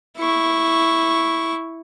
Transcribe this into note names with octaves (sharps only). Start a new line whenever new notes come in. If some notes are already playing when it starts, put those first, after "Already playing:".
E4 C#6